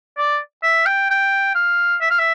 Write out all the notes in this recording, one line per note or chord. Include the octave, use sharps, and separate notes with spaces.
D5
E5
G5
G5
F5
E5
F5
E5